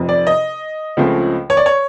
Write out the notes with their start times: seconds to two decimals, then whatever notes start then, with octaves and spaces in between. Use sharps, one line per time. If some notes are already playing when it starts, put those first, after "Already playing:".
Already playing: F1 F2 C3
0.09 D5
0.27 D#5
0.97 C#2 C#3 F3 A3 C4
1.50 C#5
1.57 D5
1.66 C#5